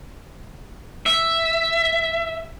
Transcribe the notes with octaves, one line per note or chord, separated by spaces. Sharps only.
E5